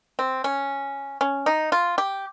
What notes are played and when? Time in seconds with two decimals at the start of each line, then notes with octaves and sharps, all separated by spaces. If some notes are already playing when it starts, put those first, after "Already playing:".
0.19 C4
0.44 C#4
1.21 C#4
1.46 D#4
1.72 F4
1.98 G4